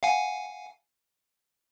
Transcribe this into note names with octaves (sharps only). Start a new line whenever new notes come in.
F5 F#5 G#5